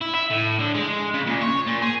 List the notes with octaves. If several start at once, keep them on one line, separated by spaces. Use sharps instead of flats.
E4
E5
A2
D3
G#3
C#3
A#2
C#5
A#2
G#4